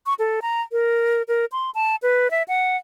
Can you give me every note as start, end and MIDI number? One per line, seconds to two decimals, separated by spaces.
0.06 0.14 85
0.19 0.40 69
0.42 0.61 82
0.72 1.22 70
1.28 1.45 70
1.52 1.70 84
1.75 1.96 81
2.02 2.31 71
2.31 2.43 76
2.48 2.77 78